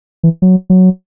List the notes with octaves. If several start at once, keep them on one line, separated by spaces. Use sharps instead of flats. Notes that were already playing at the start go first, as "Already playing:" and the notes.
E3
F#3
F#3